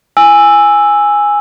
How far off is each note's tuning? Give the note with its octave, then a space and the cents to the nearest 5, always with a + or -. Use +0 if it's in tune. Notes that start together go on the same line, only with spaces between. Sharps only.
G#5 -5 E6 +0